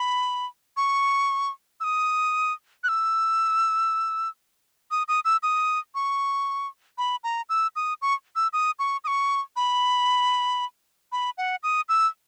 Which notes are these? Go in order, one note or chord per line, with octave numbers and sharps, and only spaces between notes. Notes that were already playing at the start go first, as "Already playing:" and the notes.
Already playing: B5
C#6
E6
D#6
F#6
E6
D#6
D#6
E6
D#6
C#6
B5
A#5
E6
D#6
C#6
E6
D#6
C#6
D#6
C#6
B5
B5
F#5
D#6
E6